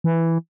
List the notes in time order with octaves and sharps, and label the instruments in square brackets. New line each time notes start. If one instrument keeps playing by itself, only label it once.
[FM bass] E3